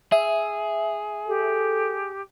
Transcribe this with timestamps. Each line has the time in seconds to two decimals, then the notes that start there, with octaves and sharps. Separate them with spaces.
0.12 G#4 E5
1.27 G4 A4